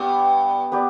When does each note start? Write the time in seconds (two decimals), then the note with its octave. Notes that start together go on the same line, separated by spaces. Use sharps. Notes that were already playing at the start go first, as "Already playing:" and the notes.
Already playing: G2 B3 G4 D5
0.72 B3 G4 D5